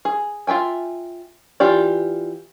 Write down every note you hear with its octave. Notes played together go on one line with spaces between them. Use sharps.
G#4
F4 E5 G5 G#5
E3 F4 G4 D5